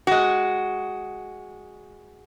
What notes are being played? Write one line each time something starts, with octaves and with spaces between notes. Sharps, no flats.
G#3 F#4